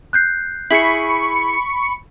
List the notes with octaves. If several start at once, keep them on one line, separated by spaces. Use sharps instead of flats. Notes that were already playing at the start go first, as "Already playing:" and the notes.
F#6 G6 C7
E4 G#4 B5 C#6 C#7